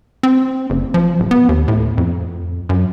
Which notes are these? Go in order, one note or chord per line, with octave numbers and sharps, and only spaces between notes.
C4
F#1
F3
D1
B3
D#2
A2
F2
F#2